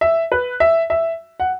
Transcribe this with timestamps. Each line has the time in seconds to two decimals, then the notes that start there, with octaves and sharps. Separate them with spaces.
0.01 E5
0.32 B4
0.60 E5
0.90 E5
1.40 F#5